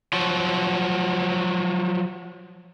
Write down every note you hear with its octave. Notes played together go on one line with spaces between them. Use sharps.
F3 F#3